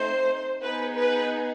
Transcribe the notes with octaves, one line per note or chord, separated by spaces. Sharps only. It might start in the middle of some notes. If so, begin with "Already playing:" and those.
Already playing: A3 C4 D#4 C5
B3 D#4 G#4 B4
B4